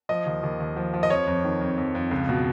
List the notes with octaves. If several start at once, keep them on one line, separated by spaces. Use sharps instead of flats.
F3 D#5
D#2
D#2
D#2
F3
F3
D#5
F2 C#5
F2
D#3
F2
F2
F2
C#2
B2